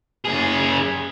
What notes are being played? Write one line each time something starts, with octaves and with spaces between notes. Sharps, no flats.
F#2 G#4